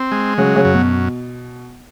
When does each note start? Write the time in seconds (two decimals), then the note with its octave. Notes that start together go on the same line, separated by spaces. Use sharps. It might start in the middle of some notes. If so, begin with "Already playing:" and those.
Already playing: C4
0.12 G#3
0.38 C#3 F#3
0.56 C#3
0.65 F#2
0.74 B2